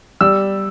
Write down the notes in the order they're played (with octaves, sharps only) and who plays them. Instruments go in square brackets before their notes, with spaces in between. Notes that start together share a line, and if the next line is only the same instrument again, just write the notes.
[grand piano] G3 E6